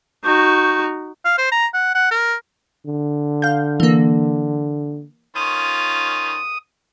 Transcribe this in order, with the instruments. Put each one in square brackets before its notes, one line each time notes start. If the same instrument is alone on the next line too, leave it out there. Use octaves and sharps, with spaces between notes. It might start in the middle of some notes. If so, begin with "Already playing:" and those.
[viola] D#4 F#4 [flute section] C#6 G6
[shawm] F5
C5
A#5
F#5
F#5
A#4
[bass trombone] D3
[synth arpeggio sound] F5 G6
E3 A#3
[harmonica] D#3 C#4 F4 [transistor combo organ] D#6